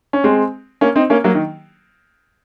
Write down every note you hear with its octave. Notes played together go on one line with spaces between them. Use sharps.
C#4
G#3 C4
A#3 C#4
C4 D#4
A#3 C#4
F#3 A#3
D#3